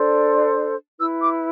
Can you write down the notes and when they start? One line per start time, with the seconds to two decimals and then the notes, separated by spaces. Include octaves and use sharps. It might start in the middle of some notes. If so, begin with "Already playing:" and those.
Already playing: D4 A4 C5
0.99 E4 B4 E6
1.20 D6